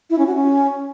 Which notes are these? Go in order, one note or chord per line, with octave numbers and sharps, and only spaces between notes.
E4
C#4
F#4
C#4